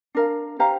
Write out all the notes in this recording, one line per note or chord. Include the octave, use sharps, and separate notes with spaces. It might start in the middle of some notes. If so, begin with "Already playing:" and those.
D4 A#4 F5
G4 C5 F5 A#5